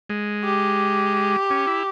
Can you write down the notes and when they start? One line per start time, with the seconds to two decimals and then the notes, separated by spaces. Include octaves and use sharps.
0.10 G#3
0.44 G4
1.50 C#4
1.67 E4